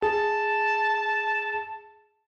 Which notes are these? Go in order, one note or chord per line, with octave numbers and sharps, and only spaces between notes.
G#4 A5